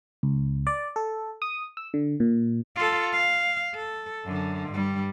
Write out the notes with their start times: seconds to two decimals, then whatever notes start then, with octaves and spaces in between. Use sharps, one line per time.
0.23 C#2
0.67 D5
0.96 A4
1.42 D#6
1.77 E6
1.94 D3
2.20 A#2
2.76 F4 A4
3.13 F5
3.75 A4
4.25 F#2 D3
4.70 G2 G3